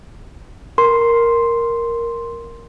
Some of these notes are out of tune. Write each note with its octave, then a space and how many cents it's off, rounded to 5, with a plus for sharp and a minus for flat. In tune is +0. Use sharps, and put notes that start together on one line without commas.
A#4 +0 C6 +0